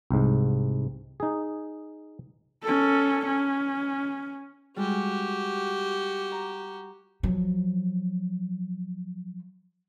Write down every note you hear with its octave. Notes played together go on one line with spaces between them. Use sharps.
C2 G#2
D#4 G#4
C#4 A4
C#4
G3 G#3 F#4 G4
A#5
F3 F#3